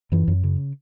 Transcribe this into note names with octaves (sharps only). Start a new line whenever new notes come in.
F#2 E3
F#2
C#3